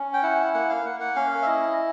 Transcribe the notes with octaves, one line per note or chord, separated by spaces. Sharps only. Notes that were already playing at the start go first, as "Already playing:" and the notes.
Already playing: C#4
G5
E4 F#5
A#3 F#5
F5
A#3 F#5
F#5
C#4 F5
E5
E4 D#5